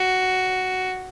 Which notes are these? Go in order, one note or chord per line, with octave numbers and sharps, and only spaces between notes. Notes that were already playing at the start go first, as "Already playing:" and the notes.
Already playing: F#4